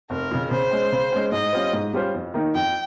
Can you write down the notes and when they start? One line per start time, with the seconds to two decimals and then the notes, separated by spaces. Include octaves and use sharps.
0.10 F1 A#4
0.31 F2 C#3
0.51 C#3 C5
0.71 G#3 C#4
0.92 C#3
1.12 G#3 C#4
1.32 G#2 D#5
1.53 G3 C#4 F4 C5
1.73 G#2
1.93 G3 C#4 F4 C5
2.14 F2
2.34 D#3 A#3 D#4 A#4
2.55 F2 G5